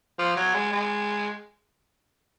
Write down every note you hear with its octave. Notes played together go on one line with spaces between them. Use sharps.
F3
F#3
G#3
G#3